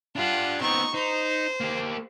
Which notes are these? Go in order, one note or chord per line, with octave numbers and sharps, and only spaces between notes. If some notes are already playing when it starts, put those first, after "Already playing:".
D4 F4 G4 F#5
B3 C4 D#4 C#6
D#4 C5
A#3 G4